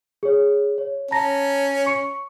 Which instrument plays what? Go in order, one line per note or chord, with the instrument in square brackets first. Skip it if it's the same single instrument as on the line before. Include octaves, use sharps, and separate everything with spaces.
[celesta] G#4 C#5
C#5
[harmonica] C#4 [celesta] A5 A#5 A#6
[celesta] C#6 C#7